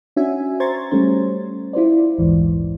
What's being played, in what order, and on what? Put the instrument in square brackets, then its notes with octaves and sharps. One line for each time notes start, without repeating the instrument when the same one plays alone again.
[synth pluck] C#4 D4 F#4 E5 G#5
C5 A#5 C6 C#6 G#6 A6
G3 A3 C#4 C5
E4 F4 C5 D5
A#1 D#2 G#2 E3